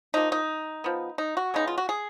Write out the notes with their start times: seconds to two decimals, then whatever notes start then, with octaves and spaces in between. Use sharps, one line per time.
0.14 F3 A#3 D#4
0.32 D#4
0.84 F3 B3
1.18 D#4
1.37 F#4
1.54 C#3 G#3 B3 D#4
1.68 F4
1.78 F#4
1.89 G#4